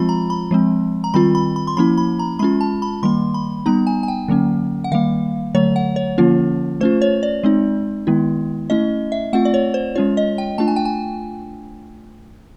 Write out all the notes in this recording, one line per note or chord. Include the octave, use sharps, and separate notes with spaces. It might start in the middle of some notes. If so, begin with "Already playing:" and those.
Already playing: F3 G#3 C4 F4 B5
A#5
B5
F3 G#3 C4
A#5
D#3 G3 C4 F4 B5
B5
B5
C6
F3 A#3 C#4 E4 B5
B5
A#5
G#3 C#4 F4 B5
A5
B5
D#3 G3 A#3 C6
B5
G3 B3 D#4 A#5
G#5
G#5
G5
D3 F#3 A#3 C#4
F#5
D#3 G3 A#3 F5
D3 F#3 A3 C#5
F#5
C#5
D3 F3 A#3 C#4 F4
A3 C#4 F4 C5
C#5
D5
G#3 C4 D#4
D#3 G#3 B3 E4
A3 C#4 E4 D#5
E5
A3 C4 F4 F#5
D5
C#5
C5
G#3 C#4 F4 C#5
D#5
G5
A3 D4 F4 A5
G#5
G5
G#5